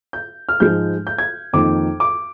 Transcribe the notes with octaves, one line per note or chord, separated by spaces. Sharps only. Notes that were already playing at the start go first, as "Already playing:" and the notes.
G6
F6
G#2 F3 G#3 G6
G6
G#6
F2 D#3 A#3 D6
D6